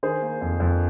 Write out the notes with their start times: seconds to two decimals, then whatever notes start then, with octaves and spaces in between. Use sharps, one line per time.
0.03 D#3 G#4 C5
0.22 A#3
0.41 F2
0.60 F2